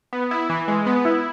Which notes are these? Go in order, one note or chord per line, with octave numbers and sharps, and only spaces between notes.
B3
E4
E3
G#3
B3
E4